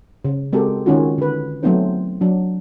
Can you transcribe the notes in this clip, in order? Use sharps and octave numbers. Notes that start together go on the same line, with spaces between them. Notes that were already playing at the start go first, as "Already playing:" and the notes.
C#3
G#3 C4 F#4 G4 A4 A#4
D#3 G#3 C#4 D#4 F4 F#4
D3 B4
F#3 A3 B3 C4 D#4 C5
F#3 D4